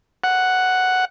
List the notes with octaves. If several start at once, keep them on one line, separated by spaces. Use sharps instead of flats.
F#5